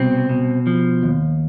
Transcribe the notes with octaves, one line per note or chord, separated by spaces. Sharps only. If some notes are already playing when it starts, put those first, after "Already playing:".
Already playing: C2 B2 C4
B2
F3
D#2